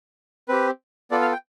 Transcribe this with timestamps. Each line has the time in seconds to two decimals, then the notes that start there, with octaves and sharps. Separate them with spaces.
0.49 C4 G4 B4
1.11 B3 F4 A4 D5
1.22 F5
1.33 G5